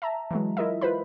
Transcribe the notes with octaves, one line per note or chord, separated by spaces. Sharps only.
E5 A5 A#5
E3 F#3 G#3
E4 F4 A#4 D#5 E5
F4 B4 C5 B5